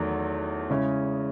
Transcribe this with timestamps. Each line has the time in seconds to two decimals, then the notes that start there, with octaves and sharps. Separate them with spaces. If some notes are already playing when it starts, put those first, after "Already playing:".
Already playing: E2 D#3 F#3 A3
0.70 C#3 G#3 C#4 E4